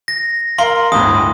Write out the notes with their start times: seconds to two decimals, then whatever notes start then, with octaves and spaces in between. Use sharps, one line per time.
0.08 A#6
0.58 A#4 F5 C6 G7
0.92 G1 D2 A2 D#6